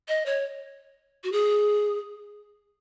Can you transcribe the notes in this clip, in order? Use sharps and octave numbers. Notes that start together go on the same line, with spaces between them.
D#5
C#5
F#4
G#4